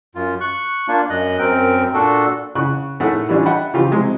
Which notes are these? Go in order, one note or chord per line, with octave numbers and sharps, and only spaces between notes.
F#2 F4
C#6 F#6
A#3 D4 F4
F#2 D#5 F#6
F#2 C4 A#4 G5
A#2 D4 F#4 A4
C#3 C#6 F#6
A2 D#3 A3 G#4 F#5
E3 G3 C#4 D4 F4
D#5 E5 F#5 G5 A5 B5
C#3 E3 F3 F4 G4
C3 F#3 G#3